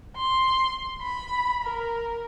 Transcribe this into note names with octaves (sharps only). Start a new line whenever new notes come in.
C6
B5
A#4